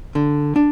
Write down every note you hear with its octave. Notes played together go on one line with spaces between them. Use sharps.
D3
D4